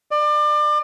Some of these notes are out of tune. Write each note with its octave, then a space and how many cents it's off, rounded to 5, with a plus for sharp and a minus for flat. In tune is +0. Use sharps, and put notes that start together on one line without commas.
D5 +30